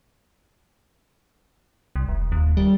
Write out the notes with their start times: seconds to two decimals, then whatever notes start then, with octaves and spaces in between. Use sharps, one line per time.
1.96 C2
2.08 E1
2.32 D#2
2.57 G3